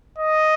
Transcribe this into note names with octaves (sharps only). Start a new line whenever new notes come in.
D#5